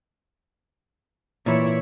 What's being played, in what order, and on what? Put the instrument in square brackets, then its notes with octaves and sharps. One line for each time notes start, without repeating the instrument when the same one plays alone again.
[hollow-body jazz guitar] A#2 E3 [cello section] E4 C#5